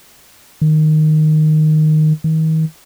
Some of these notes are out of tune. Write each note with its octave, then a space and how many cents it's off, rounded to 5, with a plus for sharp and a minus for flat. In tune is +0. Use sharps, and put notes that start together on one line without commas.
D#3 -10
D#3 +35